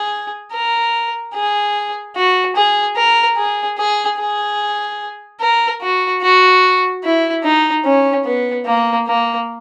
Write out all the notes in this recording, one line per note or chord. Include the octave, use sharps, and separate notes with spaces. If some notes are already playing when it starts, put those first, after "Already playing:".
Already playing: G#4
A#4
G#4
F#4
G#4
A#4
G#4
G#4
G#4
A#4
F#4
F#4
E4
D#4
C#4
B3
A#3
A#3